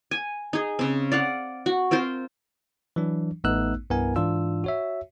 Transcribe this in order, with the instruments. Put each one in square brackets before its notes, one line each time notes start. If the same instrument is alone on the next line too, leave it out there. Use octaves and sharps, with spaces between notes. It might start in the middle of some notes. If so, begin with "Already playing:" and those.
[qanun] G#5
D#4 G#4
C#3 C4
D5 F5 F#5
F#4
C4 F4 A#4 C5
[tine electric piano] E3 F#3 D4
A1 A3 B3 D#4 E6 F#6
C2 G2 B3 E4 A#4 G#5
G#2 E3 D4 F4 E6
F#4 C#5 E5